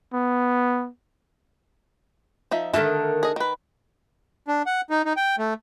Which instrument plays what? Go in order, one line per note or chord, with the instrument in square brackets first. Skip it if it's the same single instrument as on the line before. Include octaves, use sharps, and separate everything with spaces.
[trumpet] B3
[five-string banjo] F3 D#4 E5
[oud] D3 D#3 A3 [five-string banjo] A4 E5 A5
[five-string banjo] G#4 D#5
D#3 B4
[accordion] D4
F#5
D#4
D#4
G5
A3